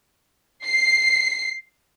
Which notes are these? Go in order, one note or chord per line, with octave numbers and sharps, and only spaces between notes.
C7